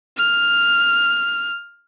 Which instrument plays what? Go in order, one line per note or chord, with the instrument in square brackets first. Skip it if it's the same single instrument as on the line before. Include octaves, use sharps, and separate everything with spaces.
[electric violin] F6